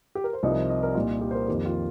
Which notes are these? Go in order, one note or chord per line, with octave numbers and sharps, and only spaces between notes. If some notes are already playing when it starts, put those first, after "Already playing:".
G4
A#4
C5
C2 C3 F3 D#4 D#5
A#4
C5
D#5
A#4
C2 A#2 A#3 D#4 F4
G4
C5
A#4
F2 D#3 A#3 G4
F4